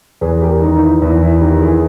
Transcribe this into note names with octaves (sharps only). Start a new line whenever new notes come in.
E2 G#4 B4
G4 A#4
D#3 D#4
D#4
E4
E2 E4
E4
D#3 D#4 G4
E4 G#4